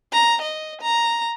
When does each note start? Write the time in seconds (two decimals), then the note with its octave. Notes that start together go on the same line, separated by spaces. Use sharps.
0.12 A#5
0.41 D#5
0.81 A#5